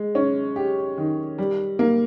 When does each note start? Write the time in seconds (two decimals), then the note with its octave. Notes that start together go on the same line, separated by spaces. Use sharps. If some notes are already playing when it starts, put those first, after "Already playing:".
Already playing: G#3
0.15 C#4
0.56 G4
0.98 D#3
1.38 G3
1.79 A#3